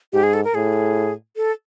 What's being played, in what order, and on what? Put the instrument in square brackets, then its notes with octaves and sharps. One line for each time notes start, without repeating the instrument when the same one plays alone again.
[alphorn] G#2 [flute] G4
[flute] G#4
A4
A#4
[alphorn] A2 [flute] G#4
[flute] A4